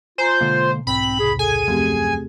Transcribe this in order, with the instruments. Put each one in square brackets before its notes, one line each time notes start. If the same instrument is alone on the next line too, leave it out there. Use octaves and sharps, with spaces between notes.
[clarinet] F4 [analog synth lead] C5 [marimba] G#5 A#5
[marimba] B2 [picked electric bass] D3 G#3 A#3
[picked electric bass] B1 G#2 [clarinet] C4 [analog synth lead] B5
[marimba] D#2 C3 [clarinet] G#4
[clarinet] G#4 [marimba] A4 [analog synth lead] G#5
[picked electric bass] C#2 F#2 F3 [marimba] A3 C4 G4